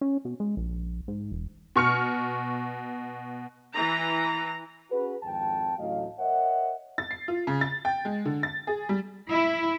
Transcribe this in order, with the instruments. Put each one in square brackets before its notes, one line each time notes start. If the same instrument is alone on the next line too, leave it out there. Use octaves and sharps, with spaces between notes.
[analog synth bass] C#4
B2
G#3
A#1
G#2
E1
[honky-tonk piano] B2 C#6 F6 C#7
[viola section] E3 A#5
[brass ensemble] C#4 F#4 G#4 B4
G#1 F2 G5 A5
A1 D2 A2 F#3 D#5 F5
A#4 C#5 D#5 E5 F#5
[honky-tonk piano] A6
C7
F4
C#3
A6
G5
G#3
D3
A6
G#4
G3
[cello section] E4